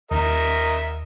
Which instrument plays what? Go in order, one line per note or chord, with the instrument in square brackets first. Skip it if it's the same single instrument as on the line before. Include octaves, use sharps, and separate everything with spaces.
[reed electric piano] D#2 [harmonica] A#4 D#5 E5